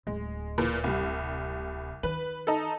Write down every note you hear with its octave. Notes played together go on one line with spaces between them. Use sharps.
D1 G#3
A#2 E3
C2 G3
D#3 B4
D#4 A4